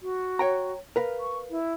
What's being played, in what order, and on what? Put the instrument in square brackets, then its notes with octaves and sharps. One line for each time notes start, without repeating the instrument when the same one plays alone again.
[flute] F#4
[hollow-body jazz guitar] C#5 G5 A#5
A#4 B4 F5
[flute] C#6
E4